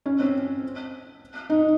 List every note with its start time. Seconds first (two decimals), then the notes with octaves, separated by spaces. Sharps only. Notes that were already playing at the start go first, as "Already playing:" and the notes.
0.06 C#4
0.20 C4
1.50 D#4